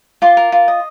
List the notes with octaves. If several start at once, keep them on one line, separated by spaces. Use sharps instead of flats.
F4 C6 D6
A#4
F4
D#5